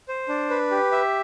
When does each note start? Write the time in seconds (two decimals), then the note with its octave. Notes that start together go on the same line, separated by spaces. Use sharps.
0.08 C5
0.29 D4
0.50 B4
0.71 G4
0.92 E5